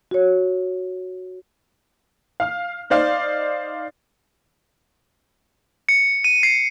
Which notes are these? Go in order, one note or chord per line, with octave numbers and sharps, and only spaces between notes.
F#4 C#5
F5 F6
D#4 C5 D5 F5
C#7
D#7
C7